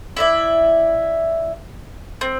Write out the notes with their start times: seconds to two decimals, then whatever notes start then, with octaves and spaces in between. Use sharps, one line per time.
0.17 E4 D5 E5
2.21 C4